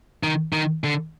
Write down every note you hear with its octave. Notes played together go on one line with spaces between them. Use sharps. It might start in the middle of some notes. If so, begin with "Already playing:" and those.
D#3
D#3
D3